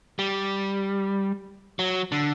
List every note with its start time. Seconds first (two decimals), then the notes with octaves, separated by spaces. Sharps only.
0.19 G3
1.79 F#3
2.12 D3